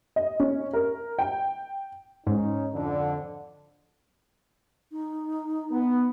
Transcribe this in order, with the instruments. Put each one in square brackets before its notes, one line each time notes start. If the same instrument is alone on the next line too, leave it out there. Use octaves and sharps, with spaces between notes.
[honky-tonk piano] D#5
C#4
A#4
G5
[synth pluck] G#2 [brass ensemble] C#4 D#4
[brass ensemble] F2 D3
[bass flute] D#4
[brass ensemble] B3